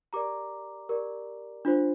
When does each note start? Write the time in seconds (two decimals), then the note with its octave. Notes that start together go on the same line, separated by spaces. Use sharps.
0.13 G4 A#4 D5 A#5 D6
0.89 G4 A#4 D5
1.65 D4 F4 C5